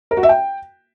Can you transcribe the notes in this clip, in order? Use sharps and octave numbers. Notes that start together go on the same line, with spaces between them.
A#4
F#4
E5
G5